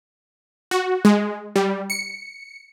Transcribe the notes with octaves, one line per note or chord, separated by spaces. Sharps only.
F#4
G#3
G3
C#7